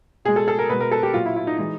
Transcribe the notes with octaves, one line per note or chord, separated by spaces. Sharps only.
B2 G#3 G#4
A4
A4
A#4
B2 G#3 B4
A#4
A4
G4
A#2 F#3 F4
E4
E4
D#4
E3 G#3 D#4